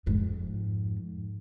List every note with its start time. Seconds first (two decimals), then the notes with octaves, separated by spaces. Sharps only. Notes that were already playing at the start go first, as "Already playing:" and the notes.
0.06 F2 G#2